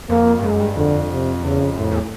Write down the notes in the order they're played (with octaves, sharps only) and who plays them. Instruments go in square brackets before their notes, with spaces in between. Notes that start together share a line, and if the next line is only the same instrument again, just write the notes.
[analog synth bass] F2 [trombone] A#3
[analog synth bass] G2
[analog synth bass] F#2 [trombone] G#3
[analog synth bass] G2
[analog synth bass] F2 [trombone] D3
[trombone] C3
[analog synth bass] E2 [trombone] C#3
[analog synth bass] F2
[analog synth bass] F#2 [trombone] A2
[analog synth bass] F2
E2